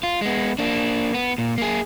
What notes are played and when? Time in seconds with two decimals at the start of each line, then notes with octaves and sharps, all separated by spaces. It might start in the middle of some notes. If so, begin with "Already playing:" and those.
0.03 F4
0.21 G#3 B3
0.59 A#3 D4
1.14 B3
1.38 A#2
1.58 A#3 G#4